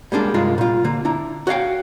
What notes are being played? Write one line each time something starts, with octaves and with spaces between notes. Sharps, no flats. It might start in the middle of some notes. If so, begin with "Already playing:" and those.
G3 G#3 A#3 D4
C2 G2 G#3 F4 A#4
A#2 F4
D3 A#3
D4 E4 A#5
F#4 C#5 D#5 F5 G5